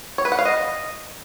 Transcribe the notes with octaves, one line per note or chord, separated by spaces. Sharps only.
C#5
B4
F#5
F5
D#5